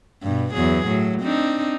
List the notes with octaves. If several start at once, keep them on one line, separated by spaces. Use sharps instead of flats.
G2 B2
E2 F#3 G#4
A2 F#3
C4 D4 D#4